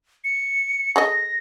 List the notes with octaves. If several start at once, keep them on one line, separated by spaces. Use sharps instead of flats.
C#7
G#4 A4 D#5 A#6